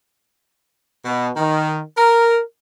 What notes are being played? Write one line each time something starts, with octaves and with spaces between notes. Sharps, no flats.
B2
D#3
A#4